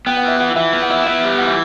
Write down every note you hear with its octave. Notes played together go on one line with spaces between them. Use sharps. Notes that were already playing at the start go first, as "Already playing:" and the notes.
B3 G5
F#5
E3 E5
E3 F#5
E3 E5
B3
F#5
E4 E5
B3 E5
G3
E3 F#5
E5